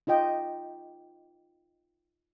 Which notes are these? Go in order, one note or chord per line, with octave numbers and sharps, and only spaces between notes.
D#4 F4 D#5 G5